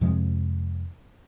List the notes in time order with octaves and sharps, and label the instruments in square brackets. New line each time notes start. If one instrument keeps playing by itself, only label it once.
[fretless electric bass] F2 C3 F3 G#3